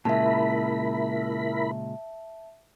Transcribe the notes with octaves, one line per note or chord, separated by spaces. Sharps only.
A#2 C#3 G#3 E4 A#4 E5 A5 B5